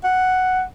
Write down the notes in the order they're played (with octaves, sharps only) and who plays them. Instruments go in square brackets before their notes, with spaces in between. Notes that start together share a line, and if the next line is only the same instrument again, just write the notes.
[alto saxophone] F#5